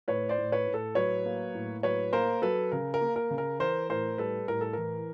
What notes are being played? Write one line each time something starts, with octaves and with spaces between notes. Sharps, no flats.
A2 B4 C#5
C5 D5
A2
B4 C#5
A2
A4
F#3 B4 C#5
A#3
A2
F#3 B4 C#5
A#3 A#4 C5
F#3 A4 B4
C#3 A#4
A#4
A#3
A#4
C#3
A#4
E3 A#4 C5
A2 A#4 C5
G3 A4 B4
A2 A#4
A4
E3 A#4